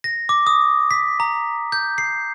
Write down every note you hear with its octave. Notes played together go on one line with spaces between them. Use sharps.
A#6
D6
D#6
B6
A#5
G6
C7